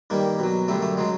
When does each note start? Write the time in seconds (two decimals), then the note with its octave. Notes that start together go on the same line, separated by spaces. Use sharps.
0.10 G2 D#3 G3 A#3
0.39 B2 F#3
0.68 F#2 D3 G3 A3
0.82 A3
0.97 C#3 F#3 G#3